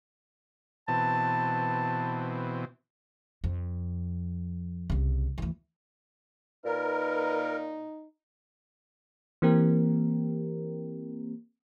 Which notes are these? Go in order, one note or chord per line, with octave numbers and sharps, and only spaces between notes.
B2 E3 C4 A5
F2
C2 C#3
D2 E3
A#2 D#4 A#4 B4
E3 A#3 C4 G4 A#4